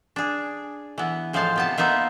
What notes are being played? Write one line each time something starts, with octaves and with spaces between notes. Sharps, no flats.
D4 G#4
E3 B3
A2 F3 G#3 C5 F5 A5
C3 B3 A5
A#3 B3 D#4 F4 E5